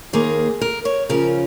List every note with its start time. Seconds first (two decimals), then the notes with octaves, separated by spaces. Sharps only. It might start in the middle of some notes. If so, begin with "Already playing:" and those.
0.13 D#2 D#3 A#3 G#4
0.61 A#4
0.85 C#5
1.09 C#3 F3 C#4 A#4